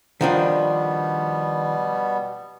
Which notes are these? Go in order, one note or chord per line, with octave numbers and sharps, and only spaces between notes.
B2 D#3 F3 G3 B3 D4